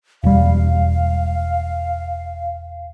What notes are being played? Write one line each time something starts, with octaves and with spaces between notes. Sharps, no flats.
E1 G3 F5